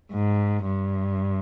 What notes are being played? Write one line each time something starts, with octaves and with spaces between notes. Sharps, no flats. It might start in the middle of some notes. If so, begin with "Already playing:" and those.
G#2
G2